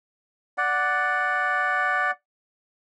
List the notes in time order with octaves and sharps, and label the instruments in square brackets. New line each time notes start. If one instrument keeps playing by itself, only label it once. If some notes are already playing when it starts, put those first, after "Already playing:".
[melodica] D5 F#5